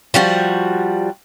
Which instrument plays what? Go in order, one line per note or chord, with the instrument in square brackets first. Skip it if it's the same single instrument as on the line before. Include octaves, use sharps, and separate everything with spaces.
[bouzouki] F3 G3 F#4